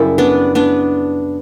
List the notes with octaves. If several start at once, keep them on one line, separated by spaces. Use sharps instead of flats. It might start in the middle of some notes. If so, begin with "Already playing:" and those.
Already playing: F#2 C#3 G3 C#4 E4
B3 D4
B3 D4